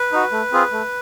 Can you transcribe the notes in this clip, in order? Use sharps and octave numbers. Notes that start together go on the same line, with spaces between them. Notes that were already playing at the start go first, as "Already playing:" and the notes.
Already playing: B4
D#4 F#4
A3
C4 F4 G#4
A3